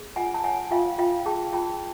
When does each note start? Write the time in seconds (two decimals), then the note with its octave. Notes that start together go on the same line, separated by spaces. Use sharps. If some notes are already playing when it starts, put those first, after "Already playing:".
Already playing: G#4
0.16 F4 F#5 G#5
0.34 A5
0.44 C#5 F#5 G#5
0.71 F4 F5 G5
0.98 F4 F5 G5
1.26 G#4 G5 A5
1.53 F4 G5 A5